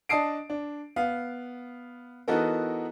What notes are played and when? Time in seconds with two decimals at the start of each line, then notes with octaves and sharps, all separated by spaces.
0.09 D4 D#5 A5 D#6 C7 D7
0.50 D4
0.96 B3 F5
2.28 E3 B3 D#4 F#4 A4 A#4